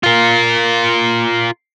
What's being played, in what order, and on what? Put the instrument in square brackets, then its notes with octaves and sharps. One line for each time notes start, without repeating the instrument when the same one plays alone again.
[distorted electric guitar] F4 A#4